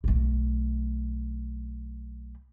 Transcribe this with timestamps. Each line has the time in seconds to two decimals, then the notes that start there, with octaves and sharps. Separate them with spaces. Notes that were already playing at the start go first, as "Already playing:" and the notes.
0.04 B1 A3